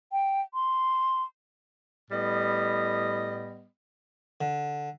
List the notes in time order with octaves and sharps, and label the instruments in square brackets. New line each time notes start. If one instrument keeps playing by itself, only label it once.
[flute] G5
C6
[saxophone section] A2 G3 B3 D#5
[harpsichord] D3